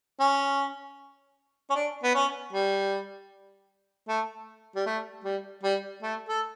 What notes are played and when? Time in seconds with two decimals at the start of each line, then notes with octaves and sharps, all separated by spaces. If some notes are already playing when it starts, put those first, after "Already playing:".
0.20 C#4
1.70 C#4
1.75 D4
2.03 B3
2.15 C#4
2.53 G3
4.09 A3
4.76 G3
4.86 A3
5.24 G3
5.63 G3
6.03 A3
6.29 A4